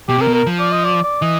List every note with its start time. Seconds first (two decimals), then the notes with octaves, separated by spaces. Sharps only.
0.09 B2 G4
0.18 C3 A#4
0.28 B2
0.34 A#4
0.47 F3
0.60 D5
0.72 D#5
0.84 D5
1.04 D5
1.22 E3 D#5